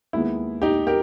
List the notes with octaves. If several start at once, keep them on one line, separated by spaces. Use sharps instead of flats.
D#2 D#3 G#3 B3 E4
D#4 G4
G4 A#4